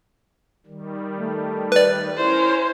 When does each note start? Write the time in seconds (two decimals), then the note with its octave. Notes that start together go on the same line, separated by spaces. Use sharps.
0.66 D#3 G3
1.19 A3
1.72 B4 D5
2.17 C#4 E4 A#4 C5 C#5